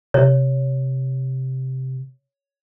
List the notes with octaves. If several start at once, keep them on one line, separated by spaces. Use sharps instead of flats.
C3 C#5